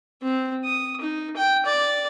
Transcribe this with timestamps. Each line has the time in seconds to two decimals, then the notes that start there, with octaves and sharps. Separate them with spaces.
0.22 C4
0.65 D#6
1.01 D#4
1.36 G5
1.65 D5